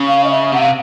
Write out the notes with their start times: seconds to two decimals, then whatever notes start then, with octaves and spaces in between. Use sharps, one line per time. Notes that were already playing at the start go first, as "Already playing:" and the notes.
Already playing: C#3
0.08 F5
0.24 D#5
0.31 E5
0.53 C3 F#5
0.60 F5